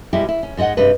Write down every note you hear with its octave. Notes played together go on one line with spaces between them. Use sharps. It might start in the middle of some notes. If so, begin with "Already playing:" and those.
B2 G3 G#3 E4 G4
E4
C#4
G#2 G#3 F#4 D#5 F#5
G2 C3 G#3 B4